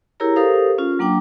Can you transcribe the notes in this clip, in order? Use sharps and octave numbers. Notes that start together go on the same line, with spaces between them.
E4 G4 G#4 A#4 C#5 A#5
G4 A4 A#4 C5 F5 D#6
C#4 F4
F#3 A#3 D4 G5 D6